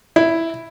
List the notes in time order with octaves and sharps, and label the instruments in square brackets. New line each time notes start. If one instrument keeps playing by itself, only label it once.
[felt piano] E4